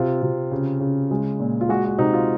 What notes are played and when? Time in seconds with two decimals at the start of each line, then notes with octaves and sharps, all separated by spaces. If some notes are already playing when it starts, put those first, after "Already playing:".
Already playing: C3 F4
0.22 C3
0.51 C#3
0.80 C#3
1.11 G#3
1.40 A#2
1.61 F4
1.69 G#3 F#4
1.85 F#4
1.99 C3 D#4
2.13 F4